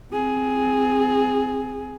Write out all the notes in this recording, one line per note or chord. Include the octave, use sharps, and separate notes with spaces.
C4 G#4